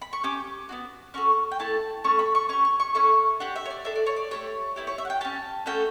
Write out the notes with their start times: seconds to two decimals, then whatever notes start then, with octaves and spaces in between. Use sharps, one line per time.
0.02 B5
0.13 C#6
0.23 C#4 G4 D6
0.69 B3 D4 F#4
1.14 C#4 F#4 A4 C#6
1.51 G5
1.59 A3 E4 A4 A5
2.04 A3 C#4 C#6
2.19 B5
2.35 C#6
2.49 C#4 G4 C#6
2.65 C#6
2.80 C#6
2.94 C#4 E4 A4 C#6
3.40 D4 G4 F#5
3.56 E5
3.66 C#5
3.70 D5
3.85 D4 A4 E5
3.96 D5
4.06 C#5
4.16 D5
4.31 A3 D4 G4 C#5
4.76 B3 E4 G4
4.87 C#5
4.98 E5
5.05 F#5
5.10 G5
5.21 C#4 G4 A5
5.66 A3 C#4 F#4 A4 G5